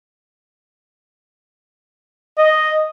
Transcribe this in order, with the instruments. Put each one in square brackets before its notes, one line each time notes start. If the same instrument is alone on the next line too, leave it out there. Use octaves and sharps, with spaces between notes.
[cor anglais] D#5